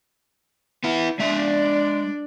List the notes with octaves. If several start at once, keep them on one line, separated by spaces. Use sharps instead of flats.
B3 E4
G#3 D4 D5 E5